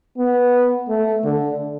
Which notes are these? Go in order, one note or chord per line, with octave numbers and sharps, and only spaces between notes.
B3
A3
D3